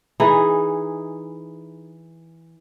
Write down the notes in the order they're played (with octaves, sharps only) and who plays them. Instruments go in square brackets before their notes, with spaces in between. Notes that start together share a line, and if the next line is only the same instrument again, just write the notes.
[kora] E3 D#4 G#4 D#5